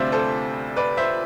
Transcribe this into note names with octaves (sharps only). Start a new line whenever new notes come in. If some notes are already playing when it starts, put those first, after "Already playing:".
Already playing: D2 C3 G3 C5 D5 E5 F5
A4 C5
B4 D5
C5 E5